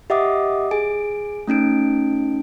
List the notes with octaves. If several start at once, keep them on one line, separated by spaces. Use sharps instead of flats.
G4 D#5 E5 F#5 D6 D#6
G#4 G#5 D7
A3 C#4 D#4 D7